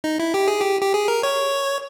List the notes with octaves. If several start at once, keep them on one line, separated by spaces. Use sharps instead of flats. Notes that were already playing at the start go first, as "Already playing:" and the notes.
D#4
E4
G4
G#4
G4
G4
G#4
A#4
C#5